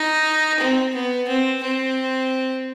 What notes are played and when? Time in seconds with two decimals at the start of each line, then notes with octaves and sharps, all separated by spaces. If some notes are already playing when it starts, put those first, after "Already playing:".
Already playing: D#4
0.60 C4
0.94 B3
1.28 C4
1.63 C4